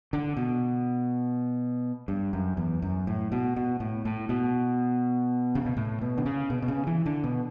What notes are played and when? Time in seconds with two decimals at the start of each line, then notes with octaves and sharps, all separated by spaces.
0.13 D3
0.37 B2
2.08 G2
2.33 F#2
2.57 E2
2.82 F#2
3.07 A2
3.32 B2
3.56 B2
3.80 A2
4.05 A2
4.29 B2
5.55 C#3
5.65 B2
5.77 A2
6.01 B2
6.18 D3
6.26 C#3
6.50 B2
6.62 B2
6.68 C#3
6.87 E3
7.06 D3
7.24 B2